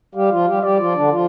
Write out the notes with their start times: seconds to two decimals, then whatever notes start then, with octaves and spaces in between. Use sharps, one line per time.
0.15 G3 G4 F5
0.31 F3 F4
0.47 G3 G4
0.63 G3 G4 D5
0.79 F3 F4
0.95 D3 D4
1.12 F3 F4